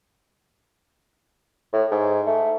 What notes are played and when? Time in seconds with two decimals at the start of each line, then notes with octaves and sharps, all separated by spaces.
1.73 A2
1.91 G#2
2.26 A3